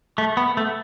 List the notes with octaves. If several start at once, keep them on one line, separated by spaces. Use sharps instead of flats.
A3
B3
A3